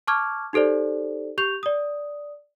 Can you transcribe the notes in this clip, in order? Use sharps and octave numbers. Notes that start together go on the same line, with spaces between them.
A5 C#6 D6 F6 G#6
D#4 G4 A4 C5 D5
G4 C#6 G6 F7
D5 D#6